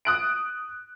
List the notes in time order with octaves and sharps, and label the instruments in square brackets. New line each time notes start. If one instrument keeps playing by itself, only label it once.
[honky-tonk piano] D#6 F#6 D7